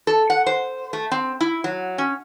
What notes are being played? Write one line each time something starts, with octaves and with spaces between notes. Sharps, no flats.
A4
F#5
C5
A3
C4
E4
F#3
C#4